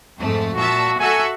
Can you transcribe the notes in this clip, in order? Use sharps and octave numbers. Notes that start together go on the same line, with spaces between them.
F2 G#2 A3
A#2 F#4 E5 A5
F#4 A4 E5 G#5